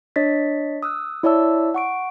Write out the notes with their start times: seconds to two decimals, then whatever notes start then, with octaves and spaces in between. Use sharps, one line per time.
0.16 D4 C#5 D#5 A6 B6
0.83 D#6 E6 F#6
1.23 E4 C#5 D5 E5 A5 E6
1.74 F#5 C#6 D7